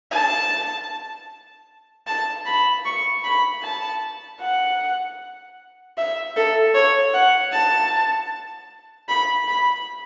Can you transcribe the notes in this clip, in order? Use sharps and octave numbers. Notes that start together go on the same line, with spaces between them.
A5
A5
B5
C#6
B5
A5
F#5
E5
A4
C#5
F#5
A5
B5
B5